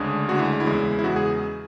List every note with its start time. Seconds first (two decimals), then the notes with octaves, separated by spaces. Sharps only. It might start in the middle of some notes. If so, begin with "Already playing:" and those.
Already playing: D2 C#3 G#3 D4 G#4
0.29 D2 C#3 G#3 D4 F#4
0.39 E4
0.60 E4
0.66 E2 C#3 G#3
0.99 E4
1.04 E2 C#3 G#3 F#4
1.16 G#4